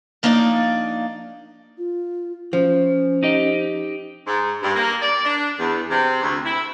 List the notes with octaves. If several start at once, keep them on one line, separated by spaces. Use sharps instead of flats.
F3 A#3 D4 D#4 D5
F4
F3 C#4
D#4 G4 D#5
G#2
G2
A#3
D5
D4
E2
C3
D2
E4